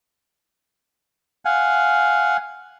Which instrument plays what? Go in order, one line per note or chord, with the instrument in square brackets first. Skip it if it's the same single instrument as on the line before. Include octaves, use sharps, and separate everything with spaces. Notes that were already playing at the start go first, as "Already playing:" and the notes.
[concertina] F5 F#5 G#5